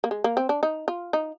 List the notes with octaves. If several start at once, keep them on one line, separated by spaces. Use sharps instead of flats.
A#3
G#3
A#3
C4
D4
D#4
F4
D#4